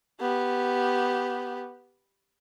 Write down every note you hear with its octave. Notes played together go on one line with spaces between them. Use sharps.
B3 G4